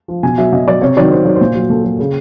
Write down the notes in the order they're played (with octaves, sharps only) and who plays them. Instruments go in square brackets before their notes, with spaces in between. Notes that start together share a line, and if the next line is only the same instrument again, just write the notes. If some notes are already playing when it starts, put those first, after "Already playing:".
[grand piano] F3
B2 G#5
F#3 E5
B2 D#5
F#3 D5
C3 C#5
D#3 F#3 D5
C3 C5
D#3 F#3 C#5
C5
A#2
F#3
A#2 A4
F#3 A4
C#3 G#4